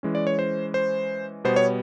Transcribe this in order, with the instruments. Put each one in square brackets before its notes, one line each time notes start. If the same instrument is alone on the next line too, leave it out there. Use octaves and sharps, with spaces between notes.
[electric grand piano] E3 G#3 C#4
D5
C#5
C5
C5
B2 G3 B3 C5
C#5